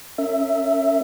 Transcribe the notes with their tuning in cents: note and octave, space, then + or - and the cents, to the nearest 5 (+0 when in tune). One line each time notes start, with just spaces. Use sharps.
C#4 +0 A#4 -35 E5 +0